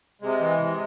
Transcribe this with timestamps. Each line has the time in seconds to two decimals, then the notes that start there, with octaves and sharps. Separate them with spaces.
0.21 C3 G#3
0.40 E3
0.59 C3